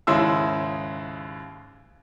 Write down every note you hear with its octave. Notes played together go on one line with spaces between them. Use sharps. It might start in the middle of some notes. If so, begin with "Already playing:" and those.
D#2 G#2 C#3 G#3 E4 E6